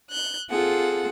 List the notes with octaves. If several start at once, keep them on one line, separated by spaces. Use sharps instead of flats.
F#6 G6
C4 F4 G#4 A4 F#5